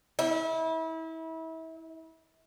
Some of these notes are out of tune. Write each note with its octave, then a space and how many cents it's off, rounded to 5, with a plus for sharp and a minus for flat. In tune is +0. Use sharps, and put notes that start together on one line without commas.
E4 -30